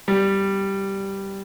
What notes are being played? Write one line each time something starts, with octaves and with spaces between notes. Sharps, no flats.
G3